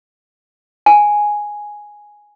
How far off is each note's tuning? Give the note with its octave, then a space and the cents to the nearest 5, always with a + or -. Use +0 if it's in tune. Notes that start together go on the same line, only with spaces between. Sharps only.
G#5 +0